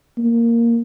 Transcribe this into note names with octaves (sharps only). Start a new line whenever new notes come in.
A#3